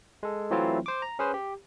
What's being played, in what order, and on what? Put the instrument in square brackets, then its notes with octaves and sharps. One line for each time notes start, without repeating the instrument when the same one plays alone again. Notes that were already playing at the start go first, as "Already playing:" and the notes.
[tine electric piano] G#3 A4
E3 F#3 A3 C4 E4 F4
C5 D6
A#5
C#4 G#4 B4 C5
G4